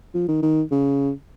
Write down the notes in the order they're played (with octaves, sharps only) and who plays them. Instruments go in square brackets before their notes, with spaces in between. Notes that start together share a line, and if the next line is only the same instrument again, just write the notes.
[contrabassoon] F3
D#3
D#3
C#3